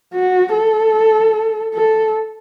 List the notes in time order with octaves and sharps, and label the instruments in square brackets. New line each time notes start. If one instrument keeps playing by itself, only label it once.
[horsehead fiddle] F#4
A4
A4